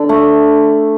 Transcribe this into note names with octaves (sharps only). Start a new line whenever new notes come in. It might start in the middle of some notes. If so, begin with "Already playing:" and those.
Already playing: D3
A3